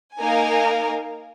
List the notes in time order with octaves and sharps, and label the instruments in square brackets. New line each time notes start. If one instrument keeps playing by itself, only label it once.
[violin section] A#3 D#4 A#4 F5 G#5